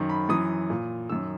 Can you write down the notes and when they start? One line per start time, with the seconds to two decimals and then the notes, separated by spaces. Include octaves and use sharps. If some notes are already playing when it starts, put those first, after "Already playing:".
Already playing: F#2 D#3
0.10 B5
0.29 F#2 E3 D#6
0.70 A#2
1.09 F#2 D#3 E6